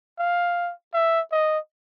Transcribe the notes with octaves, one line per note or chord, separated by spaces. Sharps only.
F5
E5
D#5